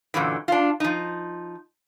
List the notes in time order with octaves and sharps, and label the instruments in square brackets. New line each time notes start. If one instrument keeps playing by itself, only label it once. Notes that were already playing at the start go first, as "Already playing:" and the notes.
[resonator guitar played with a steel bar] F#2 A#2 D3 E3
D4 F4
F3 D#4